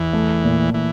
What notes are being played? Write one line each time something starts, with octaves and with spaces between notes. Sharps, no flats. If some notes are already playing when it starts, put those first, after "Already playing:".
Already playing: E2 E3
A3
A#2
E3